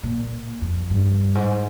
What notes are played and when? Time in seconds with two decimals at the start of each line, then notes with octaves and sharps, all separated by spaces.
0.03 A#2
0.62 F2
0.90 G2
1.35 G#2